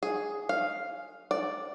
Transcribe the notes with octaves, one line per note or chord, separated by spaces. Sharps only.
G#4
F5
D5